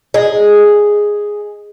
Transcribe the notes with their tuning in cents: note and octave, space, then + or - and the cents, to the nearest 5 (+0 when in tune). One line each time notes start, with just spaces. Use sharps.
G#4 +0 D#5 +0